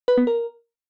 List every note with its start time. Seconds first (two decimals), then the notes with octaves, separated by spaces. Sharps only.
0.08 B4
0.18 B3
0.27 A#4